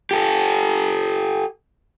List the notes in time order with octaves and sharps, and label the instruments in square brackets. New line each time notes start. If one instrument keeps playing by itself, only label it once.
[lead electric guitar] G4 A4